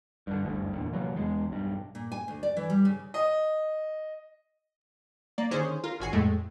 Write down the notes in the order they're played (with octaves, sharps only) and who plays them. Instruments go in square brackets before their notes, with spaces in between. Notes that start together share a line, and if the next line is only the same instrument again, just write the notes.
[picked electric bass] G2 D3
F#1 D2 G2
E2 A#2 D3
C3 E3 F#3 A#3
E1 E2 D#3 G#3
B1 G2
[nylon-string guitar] A#2
G#5
D2
D5
E3
G3
C#3
[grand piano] D#5
[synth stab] A#3 D5
D3 D#3 C#4 G#4 C5
F4 A#4
G#1 F#4 G#5 C7
F2 A2 G#3 A3